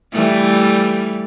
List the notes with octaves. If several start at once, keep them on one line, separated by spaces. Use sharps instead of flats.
E3 G3 A3